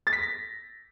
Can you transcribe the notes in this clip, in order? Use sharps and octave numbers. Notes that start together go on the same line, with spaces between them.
A6
B6
A#6